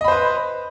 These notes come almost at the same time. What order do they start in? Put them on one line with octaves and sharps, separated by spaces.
D#5 B5 C5 B4